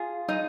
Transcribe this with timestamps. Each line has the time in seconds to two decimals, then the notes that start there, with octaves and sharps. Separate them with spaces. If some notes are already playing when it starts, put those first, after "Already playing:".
Already playing: F4 G#4
0.29 D#4 D#5